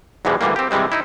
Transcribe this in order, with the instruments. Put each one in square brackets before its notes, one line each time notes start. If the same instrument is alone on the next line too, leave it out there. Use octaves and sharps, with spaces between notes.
[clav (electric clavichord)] E2 G#2 B2 E3 G3 G#3
D2 G2 D3 E3 G3 A#3
C4 G4
C3 E3 G3 G#3 C4
D#4 E4